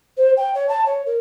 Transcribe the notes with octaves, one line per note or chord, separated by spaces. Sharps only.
C5
G5
C#5
A5
C#5
A#4